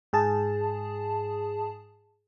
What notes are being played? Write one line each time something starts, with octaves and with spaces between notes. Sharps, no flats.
G#2 G#4 A5